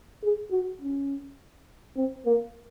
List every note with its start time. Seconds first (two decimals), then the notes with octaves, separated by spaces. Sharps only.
0.23 G#4
0.51 F#4
0.81 C#4
1.97 C4
2.26 A#3